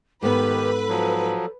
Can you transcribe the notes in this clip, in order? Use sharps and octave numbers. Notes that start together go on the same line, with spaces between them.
G#2 D#3 B3 G4 A4 B4
F3 F#3